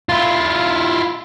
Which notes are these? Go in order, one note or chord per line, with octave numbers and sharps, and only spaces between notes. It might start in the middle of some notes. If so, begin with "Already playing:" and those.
E4 F4